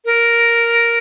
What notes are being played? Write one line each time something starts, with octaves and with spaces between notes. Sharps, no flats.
A#4